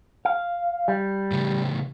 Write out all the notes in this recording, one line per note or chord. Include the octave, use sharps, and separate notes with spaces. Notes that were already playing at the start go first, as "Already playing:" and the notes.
F5
G3
A2 C#3